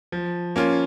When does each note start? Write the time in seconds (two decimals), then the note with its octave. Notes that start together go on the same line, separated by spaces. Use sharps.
0.12 F3
0.56 A#3 C#4 F4